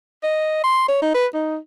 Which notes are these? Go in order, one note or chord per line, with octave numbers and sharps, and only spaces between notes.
D#5
C6
C#5
D#4
B4
D#4